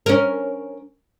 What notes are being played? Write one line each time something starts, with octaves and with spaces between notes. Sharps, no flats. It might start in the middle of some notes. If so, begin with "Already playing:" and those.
C#4 A#4